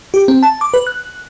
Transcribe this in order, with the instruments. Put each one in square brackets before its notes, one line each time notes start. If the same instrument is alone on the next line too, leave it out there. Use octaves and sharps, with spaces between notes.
[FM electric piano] G4
C4
A5
D6
B4
F#6